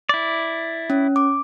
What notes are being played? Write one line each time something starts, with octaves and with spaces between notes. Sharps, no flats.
E4 D5
C#4
D6